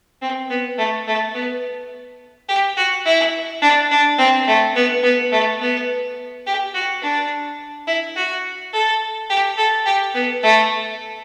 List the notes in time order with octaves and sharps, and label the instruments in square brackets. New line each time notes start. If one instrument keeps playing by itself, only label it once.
[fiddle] C4
B3
A3
A3
B3
G4
F#4
E4
D4
D4
C4
A3
B3
B3
A3
B3
G4
F#4
D4
E4
F#4
A4
G4
A4
G4
B3
A3